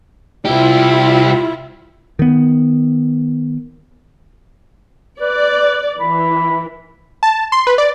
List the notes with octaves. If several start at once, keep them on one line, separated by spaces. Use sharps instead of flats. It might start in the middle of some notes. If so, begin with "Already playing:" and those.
C2 E4 F4 G4
D#3 B3
B4 D5
E3 B5
A5
C6
B4
D5